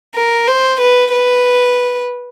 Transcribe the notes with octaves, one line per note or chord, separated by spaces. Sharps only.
A#4
C5
B4
B4